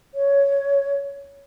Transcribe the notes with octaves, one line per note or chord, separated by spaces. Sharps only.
C#5